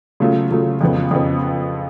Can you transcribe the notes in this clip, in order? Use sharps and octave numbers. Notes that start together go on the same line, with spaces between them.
C#3 F#3 A3 F4
C#3 F#3 A3 F4
F2 C#3 F3 B3
F2 C#3 F3 B3